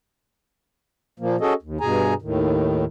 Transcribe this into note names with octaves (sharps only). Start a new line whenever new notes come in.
A#2 F3 A#3
C#4 F#4 G#4 A4 D#5
D#2
G2 B2 G#4 G#5 A#5
D#2 A2 D#3